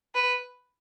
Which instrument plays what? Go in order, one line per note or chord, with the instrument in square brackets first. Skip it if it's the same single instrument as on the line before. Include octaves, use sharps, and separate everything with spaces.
[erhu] B4